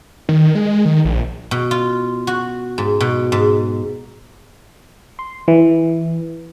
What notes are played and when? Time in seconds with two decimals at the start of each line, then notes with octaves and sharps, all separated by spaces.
0.29 D#3
0.55 G#3
0.85 D#3
1.05 A#1
1.51 B2
1.71 F4
2.27 F#4
2.78 G#2
3.01 B2
3.32 G#2
5.19 C6
5.48 E3